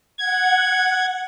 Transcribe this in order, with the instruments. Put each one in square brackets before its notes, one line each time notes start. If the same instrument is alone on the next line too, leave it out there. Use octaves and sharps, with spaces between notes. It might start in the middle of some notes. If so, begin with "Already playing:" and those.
[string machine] F#5 [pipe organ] G#6